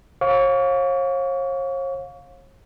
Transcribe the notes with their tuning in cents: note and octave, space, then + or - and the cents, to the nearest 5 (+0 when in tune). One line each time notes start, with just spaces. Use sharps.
C#5 -40 F5 +25 C#6 +35